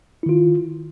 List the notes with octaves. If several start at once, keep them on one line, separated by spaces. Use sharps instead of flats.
D#3 E4 F4